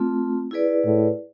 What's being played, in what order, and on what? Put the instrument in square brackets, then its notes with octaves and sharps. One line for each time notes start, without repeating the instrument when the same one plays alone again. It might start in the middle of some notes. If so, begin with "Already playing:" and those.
Already playing: [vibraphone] A3 C4 F4
E4 G#4 B4 D5
[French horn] A2